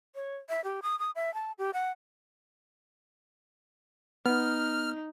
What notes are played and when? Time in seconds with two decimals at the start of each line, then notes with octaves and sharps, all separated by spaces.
0.15 C#5
0.49 E5
0.64 G4
0.82 D#6
0.99 D#6
1.15 E5
1.34 A5
1.58 G4
1.73 F#5
4.26 B3 D#4 F6